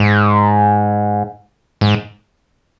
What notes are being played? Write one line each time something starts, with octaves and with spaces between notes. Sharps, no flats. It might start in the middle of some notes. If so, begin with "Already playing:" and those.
Already playing: G#2
G#2